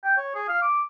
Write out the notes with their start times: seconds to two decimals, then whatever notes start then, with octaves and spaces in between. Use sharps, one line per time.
0.04 G5
0.18 C#5
0.35 G#4
0.48 F5
0.62 D6